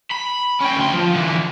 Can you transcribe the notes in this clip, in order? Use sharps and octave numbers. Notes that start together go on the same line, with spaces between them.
B5
C#4 G5
D2 C6
F3
D3 E3